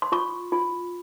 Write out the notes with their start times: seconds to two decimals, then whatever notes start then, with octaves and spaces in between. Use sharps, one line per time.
0.02 C6
0.12 F4 C#6
0.52 F4